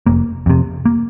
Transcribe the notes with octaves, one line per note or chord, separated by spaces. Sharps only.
F1 A#3
F2 C3
A#3